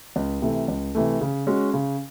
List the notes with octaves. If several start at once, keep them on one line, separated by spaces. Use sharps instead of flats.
C#2
C3 E3 A3
C#2
C3 E3 A3
C#3
G#3 C#4 F#4
C#3